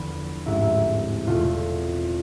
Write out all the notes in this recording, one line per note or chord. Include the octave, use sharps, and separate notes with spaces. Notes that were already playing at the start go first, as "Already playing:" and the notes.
Already playing: E2 D3 F3 B3 B4
A1 G#2 G#3 C4 E4
E2 B2 A3 C4 F4